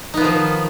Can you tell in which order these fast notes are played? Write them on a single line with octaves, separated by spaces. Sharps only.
D#4 B3 F3 D#3